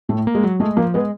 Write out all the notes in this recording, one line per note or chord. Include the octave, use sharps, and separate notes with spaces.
A2 A3
A#3
G#3
F#3
G#3 A3
F3 A#3
G#3 B3